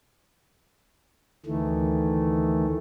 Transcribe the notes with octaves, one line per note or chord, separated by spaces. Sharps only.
D2 D#3 E3 A3